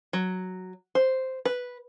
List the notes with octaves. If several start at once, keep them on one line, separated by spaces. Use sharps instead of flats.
F#3
C5
B4